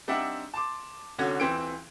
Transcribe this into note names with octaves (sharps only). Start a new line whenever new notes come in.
G3 C4 D4 D#4 E5 F#5
A5 C6 D6
C2 D3 C#4 F#4 G#6
D#1 E3 C4 G5 C6 D7